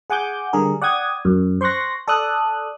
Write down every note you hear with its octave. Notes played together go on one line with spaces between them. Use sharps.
G#4 F#5 G#5 D6 G6
D3 G3 G#4 A#4
D5 F#5 G5 D#6 G#6
F#2
C5 C6 C#6 F#6 A#6
A4 D5 D#6 F#6